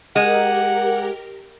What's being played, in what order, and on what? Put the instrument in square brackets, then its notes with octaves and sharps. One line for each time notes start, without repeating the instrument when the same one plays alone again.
[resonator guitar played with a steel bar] G#3 [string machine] G4 A#4 [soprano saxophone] F#5